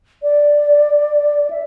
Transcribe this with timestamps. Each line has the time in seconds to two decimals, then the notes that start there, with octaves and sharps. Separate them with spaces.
0.22 D5
1.50 E5